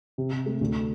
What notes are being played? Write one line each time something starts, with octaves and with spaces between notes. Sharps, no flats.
C3
C3
A3
D2